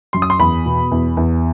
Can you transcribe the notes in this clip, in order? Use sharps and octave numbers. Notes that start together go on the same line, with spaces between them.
F#2 C6
D#6
C6
E2 B5
B2
E2
E2